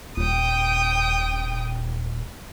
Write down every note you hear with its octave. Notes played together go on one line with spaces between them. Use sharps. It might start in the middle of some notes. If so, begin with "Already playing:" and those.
D#1 G5 D#6